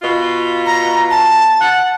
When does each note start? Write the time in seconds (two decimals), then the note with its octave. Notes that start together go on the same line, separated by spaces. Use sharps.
0.02 B2 F4
0.66 A#5
1.11 A5
1.61 F#5